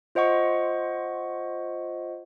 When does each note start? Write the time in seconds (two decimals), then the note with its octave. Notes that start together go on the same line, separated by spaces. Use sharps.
0.15 F4 C5 D#5 F#5 C#6